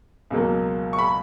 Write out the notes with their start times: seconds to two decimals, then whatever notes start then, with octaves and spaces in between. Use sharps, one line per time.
0.30 C#2 B2 F#3 A#3
0.93 C#6
0.99 B5